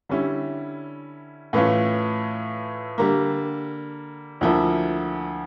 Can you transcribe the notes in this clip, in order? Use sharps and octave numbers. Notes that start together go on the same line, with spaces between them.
D3 G3 C#4 E4
A2 E3 A3 C#4 F4
D3 G3 A#3
D2 D3 F3 A#3 E4